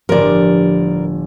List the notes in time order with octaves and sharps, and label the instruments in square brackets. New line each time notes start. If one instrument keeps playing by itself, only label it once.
[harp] G1 A2 F3 [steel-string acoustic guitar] A#4 D5